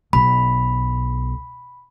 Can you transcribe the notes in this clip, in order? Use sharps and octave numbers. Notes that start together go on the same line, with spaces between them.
B1 B5